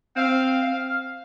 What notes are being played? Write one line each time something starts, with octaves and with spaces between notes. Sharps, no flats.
C4 F5
F5